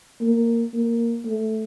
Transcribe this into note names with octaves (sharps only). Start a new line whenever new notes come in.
A#3
A#3
A3